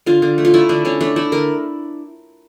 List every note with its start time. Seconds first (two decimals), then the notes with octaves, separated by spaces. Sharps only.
0.06 D3 F4
0.22 D3
0.38 A3
0.45 F4
0.54 A3 E4
0.69 D3 D4
0.85 D3 C#4
1.01 A3 D4
1.16 A3 E4
1.32 D3 A#4